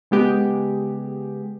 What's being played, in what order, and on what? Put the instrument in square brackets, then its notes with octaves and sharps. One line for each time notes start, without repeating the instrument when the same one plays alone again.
[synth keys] C#3 G#3 B3 G4 G#4